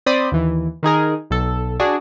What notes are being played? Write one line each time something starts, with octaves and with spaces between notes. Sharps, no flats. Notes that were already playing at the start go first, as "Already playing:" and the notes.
C4 C5 D5 B5 D#6
D#2 E3
D#3 D#4 G#4 A#4
B1 A4
D4 F#4 G#4